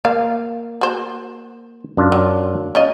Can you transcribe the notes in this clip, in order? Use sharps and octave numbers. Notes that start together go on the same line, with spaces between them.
A#3 F5
F#4 C5
F#2 D4 F4
F#3
C#4 F4 D#5